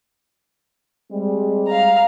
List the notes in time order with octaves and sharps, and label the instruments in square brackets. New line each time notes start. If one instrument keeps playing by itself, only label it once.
[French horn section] G3 G#3 C4
[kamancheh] F5 A#5